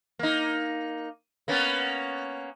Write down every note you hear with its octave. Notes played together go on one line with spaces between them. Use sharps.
A#3 D#4
A#3 B3 C#4